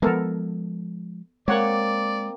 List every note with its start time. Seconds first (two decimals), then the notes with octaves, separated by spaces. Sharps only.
0.02 F3 G#3 B3 A4 A#4
1.48 G#3 A#3 C4 C#5 D5 F#5